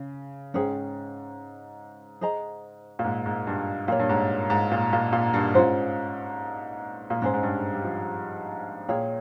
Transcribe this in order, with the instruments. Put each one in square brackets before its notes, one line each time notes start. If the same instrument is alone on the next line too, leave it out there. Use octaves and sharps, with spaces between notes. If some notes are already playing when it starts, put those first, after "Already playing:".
Already playing: [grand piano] C#3
[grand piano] G#2 [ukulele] C#4 G#4 C5 G5
[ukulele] G#4 C5 D#5 A#5
[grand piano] A#2
G#2
G#2
G2
[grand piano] A#2 [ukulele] G4 A#4 C#5
[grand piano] G2
G#2
G#2
A#2
A#2
A#2
G2
[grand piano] G#2 [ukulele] C#4 F4 C5
[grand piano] A#2
[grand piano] G#2 [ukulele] C#4 G#4 C5
[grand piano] G#2
G2
G3
F3
[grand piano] A#2 [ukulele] G#4 C#5 G5